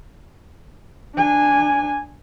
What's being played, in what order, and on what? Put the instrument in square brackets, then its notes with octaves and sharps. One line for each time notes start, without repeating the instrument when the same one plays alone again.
[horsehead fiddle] D4 G#5